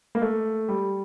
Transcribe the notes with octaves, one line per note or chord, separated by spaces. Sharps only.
A#3
A3
G3